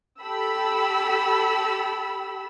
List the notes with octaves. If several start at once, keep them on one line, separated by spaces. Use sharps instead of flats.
G4 A4 B5 E6